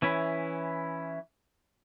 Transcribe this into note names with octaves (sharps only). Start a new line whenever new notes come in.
E3 C#4 E4